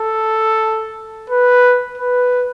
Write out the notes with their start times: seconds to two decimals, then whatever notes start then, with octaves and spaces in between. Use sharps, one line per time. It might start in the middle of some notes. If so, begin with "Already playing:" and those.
Already playing: A4
1.30 B4
1.98 B4